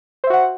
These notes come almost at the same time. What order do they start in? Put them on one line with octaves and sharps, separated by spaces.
C5 E5 F#4 F#5